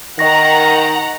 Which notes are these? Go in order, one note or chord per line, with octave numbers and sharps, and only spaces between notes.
D#3 D#5 F#5 A#5 C#6 A#6